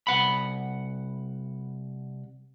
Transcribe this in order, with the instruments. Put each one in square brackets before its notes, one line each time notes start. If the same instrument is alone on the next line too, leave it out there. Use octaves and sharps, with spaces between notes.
[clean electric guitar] C2 F#5 B5